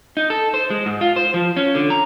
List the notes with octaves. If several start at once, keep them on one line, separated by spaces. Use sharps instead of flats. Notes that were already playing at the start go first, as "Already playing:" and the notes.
D#4
A4
C5
G#3
G#2
F4
C5
F3
C#4
D3
A#5